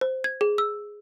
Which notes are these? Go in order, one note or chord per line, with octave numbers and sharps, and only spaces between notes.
C5
G#6
G#4
E6